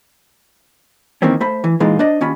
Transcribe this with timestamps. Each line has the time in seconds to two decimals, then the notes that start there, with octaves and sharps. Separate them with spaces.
1.22 D#3 E3 A#3 C4 C#4
1.40 A3 C5 B5
1.64 E3
1.80 A#2 E3 G#3 D#4 F4
1.99 D4 C5 D5 D#5
2.21 D#2 C#4 F4 B5